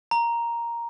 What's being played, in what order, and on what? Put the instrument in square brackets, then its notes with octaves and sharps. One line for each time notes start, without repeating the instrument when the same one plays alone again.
[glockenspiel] A#5